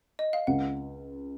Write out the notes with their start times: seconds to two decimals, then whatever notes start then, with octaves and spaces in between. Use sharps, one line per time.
0.19 D#5
0.33 F5
0.47 C#2 F#5